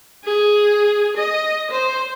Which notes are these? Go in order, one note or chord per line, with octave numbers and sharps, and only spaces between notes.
G#4
D#5
C5